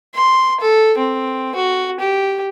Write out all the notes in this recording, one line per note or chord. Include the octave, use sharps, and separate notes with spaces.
C6
A4
C4
F#4
G4